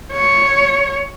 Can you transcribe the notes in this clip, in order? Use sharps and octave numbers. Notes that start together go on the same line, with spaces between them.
C#5